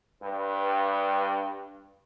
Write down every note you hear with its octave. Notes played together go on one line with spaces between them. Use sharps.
G2 B4